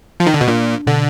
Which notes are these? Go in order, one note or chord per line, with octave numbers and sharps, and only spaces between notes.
F3
D#3
D3
B2
A#2 D4
B2 D3